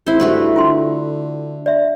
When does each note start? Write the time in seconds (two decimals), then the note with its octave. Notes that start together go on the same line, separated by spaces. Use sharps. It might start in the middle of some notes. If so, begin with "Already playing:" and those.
0.07 G#1 E4 C5
0.20 G2 A3 F#4 B4
0.56 D3 F4 G5 C6
1.66 D5 E5